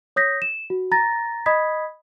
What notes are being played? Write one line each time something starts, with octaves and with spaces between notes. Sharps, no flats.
C#5 D#6 G6 A#6 B6
E7
F#4
A#5 A6 A#6
D#5 B5 D#6 G#6 B6